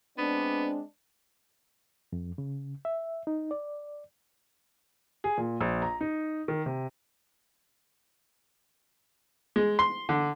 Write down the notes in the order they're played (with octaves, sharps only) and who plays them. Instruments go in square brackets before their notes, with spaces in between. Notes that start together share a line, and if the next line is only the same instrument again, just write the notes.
[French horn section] G#3 C4 D4 [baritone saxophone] B3
[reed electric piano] F2
C#3
E5
D#4
D5
[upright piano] G#4
A#2
A#1
A#5
D#4
D#3
C3
[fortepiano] G#3
C6
D3